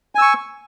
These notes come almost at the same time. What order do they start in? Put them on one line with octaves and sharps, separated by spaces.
G#5 E6 C#6